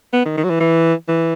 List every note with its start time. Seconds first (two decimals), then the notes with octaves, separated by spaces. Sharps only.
0.13 B3
0.26 D#3
0.37 D#3
0.44 F#3
0.50 E3
0.60 E3
1.08 E3